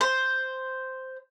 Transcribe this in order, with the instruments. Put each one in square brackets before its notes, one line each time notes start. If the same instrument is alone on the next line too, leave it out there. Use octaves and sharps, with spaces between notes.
[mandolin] C5